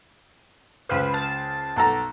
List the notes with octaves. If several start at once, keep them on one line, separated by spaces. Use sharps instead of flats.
C#2 B4 C5 F5
A5
B1 A4 A#5